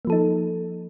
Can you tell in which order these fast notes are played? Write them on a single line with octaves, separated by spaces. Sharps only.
A#3 F3 A4 D#4